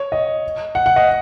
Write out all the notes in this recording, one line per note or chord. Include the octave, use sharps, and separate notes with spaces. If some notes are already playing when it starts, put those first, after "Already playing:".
Already playing: C#5
D#5
F#5
F#5
D#5